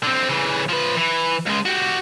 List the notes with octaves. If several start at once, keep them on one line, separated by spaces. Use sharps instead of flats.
D3 C4
C#3 E3
F3 B4
E3
C#2 G#3
F#4 G4